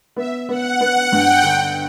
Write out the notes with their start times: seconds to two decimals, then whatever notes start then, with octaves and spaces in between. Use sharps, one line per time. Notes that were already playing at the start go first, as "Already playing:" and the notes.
0.16 B3 E5
0.49 B3 F#5
0.81 B3 F#5
1.12 G2 G5
1.43 D3 G5